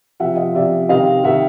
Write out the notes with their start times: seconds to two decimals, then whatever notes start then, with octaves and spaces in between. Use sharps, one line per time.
0.20 C3 F3 E5 F#5
0.37 D#5 F5
0.54 C3 F3 D5 E5
0.89 C3 D#3 D#5 F5
1.23 C3 D#3 E5 F#5